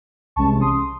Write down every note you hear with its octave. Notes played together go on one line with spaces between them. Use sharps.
C2 C3 E3 G#3 C#4 A5 C#6
C6 D#6